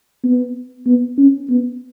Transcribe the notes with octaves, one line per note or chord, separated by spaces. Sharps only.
B3
B3
C#4
B3